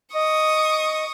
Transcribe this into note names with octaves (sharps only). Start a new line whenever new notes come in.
D#5 C#6 D#6